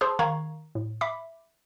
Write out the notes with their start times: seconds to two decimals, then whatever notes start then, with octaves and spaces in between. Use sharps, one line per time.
0.01 G#4 C5 A5 C6 D6 E6
0.19 D#3 F5 A#5 C#6 G#6
0.75 A2
1.01 E5 B5 D6